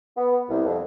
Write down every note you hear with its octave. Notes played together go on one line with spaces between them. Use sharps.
B3
C2
F2